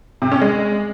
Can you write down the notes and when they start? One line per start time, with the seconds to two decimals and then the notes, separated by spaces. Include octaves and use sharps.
0.22 C3
0.32 C#4
0.41 G#3